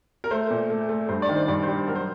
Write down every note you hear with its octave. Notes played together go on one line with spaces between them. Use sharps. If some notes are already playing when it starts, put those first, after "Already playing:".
A#4
A3 C5
A#2
A3
A3
G2 C5
D5
D#3
C5
G2 D5
C5
G3
F#3 A#4
C5